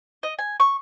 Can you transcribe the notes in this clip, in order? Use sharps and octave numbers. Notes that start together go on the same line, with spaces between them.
D#5
G#5
C#6